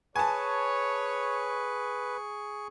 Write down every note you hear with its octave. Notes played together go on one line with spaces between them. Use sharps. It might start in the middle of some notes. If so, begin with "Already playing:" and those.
G#4 B4 C#5 G#5 A5 C#6